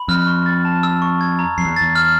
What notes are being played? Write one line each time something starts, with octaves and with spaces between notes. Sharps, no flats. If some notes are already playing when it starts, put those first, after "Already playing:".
Already playing: B5
F2 F6
C#6
A6
A5
E6
C#6
G#6
A#5
F2 C7
E2
E2 A6
F6